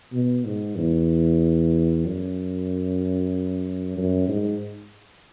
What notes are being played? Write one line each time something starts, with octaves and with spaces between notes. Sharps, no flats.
B2
G#2
E2
F#2
F#2
G#2